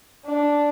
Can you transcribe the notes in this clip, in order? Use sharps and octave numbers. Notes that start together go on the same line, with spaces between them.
D4